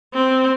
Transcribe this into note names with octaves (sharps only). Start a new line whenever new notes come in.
C4